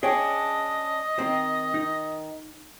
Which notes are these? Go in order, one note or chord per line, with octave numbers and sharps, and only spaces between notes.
C#4 D4 G#4 C#5 D#5 G5
D#3 C4 C5
D#4